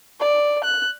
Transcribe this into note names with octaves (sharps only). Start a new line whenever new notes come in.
D5
F#6